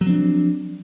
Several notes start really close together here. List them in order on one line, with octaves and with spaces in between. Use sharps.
F#3 F3 C4 D4